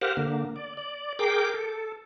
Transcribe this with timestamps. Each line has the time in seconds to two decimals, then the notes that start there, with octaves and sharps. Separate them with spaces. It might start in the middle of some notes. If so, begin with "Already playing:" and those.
0.01 G4 A#4 C5 F5 F#5
0.17 D3 A#3
0.56 D5
0.77 D5
1.19 G#4 A#4 G5 D6
1.54 A4